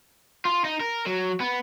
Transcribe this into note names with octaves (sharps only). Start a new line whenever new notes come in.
F4
D#4
A#4
F#3
B3